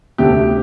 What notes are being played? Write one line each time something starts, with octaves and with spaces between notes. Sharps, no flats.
D2 C3 A3 G4